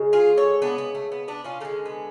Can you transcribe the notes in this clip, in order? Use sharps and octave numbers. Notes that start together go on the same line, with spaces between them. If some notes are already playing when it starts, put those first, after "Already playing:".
Already playing: C#3 G#3
F4 G#4
A4 C#5
B3 D4
B3
A3
B3
B3 D4
C#4 F4
D3 G#3 A3 C#4
B3